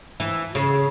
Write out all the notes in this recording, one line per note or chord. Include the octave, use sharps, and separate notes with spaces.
E3
C#3